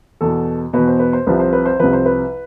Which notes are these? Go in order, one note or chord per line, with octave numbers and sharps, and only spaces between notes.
E2 B2 A4
E2 B2 B4
C5
B4
C5
C2 C3 F3 B4
C5
B4
C5
C2 C3 F3 B4
C5
B4